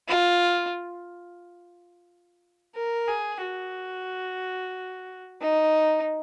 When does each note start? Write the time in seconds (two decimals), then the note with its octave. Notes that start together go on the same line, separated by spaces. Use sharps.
0.08 F4
2.75 A#4
3.08 G#4
3.41 F#4
5.41 D#4